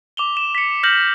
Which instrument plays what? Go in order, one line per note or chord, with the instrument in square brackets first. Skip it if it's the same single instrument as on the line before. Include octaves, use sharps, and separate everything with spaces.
[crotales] D6 F7 G7
E7
B6 C#7
F6 G6 A#6 F#7